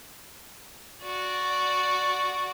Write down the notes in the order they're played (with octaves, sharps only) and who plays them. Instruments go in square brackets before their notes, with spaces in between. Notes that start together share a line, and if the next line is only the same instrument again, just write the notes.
[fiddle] F#4 D5